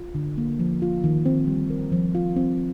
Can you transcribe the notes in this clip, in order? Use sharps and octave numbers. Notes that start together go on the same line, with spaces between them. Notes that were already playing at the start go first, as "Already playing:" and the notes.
Already playing: F4
D3
A#3
F3
F4
D#3
C4
G3
A#4
F3
F4
C4